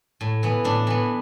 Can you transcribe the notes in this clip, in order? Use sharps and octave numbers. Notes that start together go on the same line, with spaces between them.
A2
E3 B3
A2 D4
E3 B3